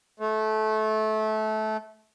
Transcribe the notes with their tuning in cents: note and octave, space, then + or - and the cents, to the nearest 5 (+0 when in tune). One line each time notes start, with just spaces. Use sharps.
A3 -20